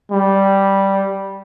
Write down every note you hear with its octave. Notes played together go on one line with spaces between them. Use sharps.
G3